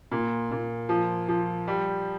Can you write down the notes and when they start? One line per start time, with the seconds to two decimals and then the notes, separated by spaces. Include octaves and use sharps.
0.11 A#2
0.51 A#2
0.89 F3
1.28 F3
1.68 G3